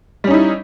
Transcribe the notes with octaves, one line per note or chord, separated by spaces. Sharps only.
G3 C#4 D#4 E4